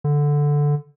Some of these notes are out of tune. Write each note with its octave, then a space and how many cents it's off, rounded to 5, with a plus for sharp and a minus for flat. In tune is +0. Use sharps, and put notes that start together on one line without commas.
D3 -5